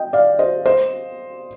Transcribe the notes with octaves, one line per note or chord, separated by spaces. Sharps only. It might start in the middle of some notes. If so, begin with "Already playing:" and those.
Already playing: D#5 G5
D5 F5
C5 D#5
C5 D#5